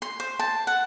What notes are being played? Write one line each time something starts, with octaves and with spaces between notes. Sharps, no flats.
C6
C5
A5
F#5